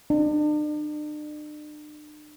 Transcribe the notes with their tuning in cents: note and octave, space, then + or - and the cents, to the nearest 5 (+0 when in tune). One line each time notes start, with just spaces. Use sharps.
D4 +40